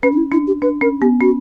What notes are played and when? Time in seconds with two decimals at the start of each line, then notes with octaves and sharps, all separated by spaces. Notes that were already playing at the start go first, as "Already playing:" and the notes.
0.03 C#4 B4
0.12 D4
0.17 E4
0.32 D4 E4
0.47 G4
0.62 D4 B4
0.81 C#4 A#4
1.01 B3 G4
1.20 C#4 F#4